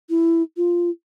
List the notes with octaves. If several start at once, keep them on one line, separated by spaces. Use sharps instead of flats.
E4
F4